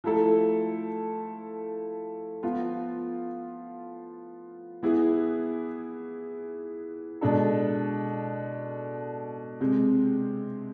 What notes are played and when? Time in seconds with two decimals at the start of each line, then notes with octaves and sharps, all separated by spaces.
0.04 F3 A3 E4 A4
2.43 F3 B3 F4
4.83 E3 B3 E4 G#4
7.21 B2 G#3 D4 A4
9.61 C3 G#3 C4